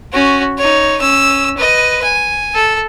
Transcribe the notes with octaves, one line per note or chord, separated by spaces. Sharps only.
C#4 F#4
D#4 C#5
C#4 E6
B4 D#5
G#5
A4